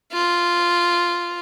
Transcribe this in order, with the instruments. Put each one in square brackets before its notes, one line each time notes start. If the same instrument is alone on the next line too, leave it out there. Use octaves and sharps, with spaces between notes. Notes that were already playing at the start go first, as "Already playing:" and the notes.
[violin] F4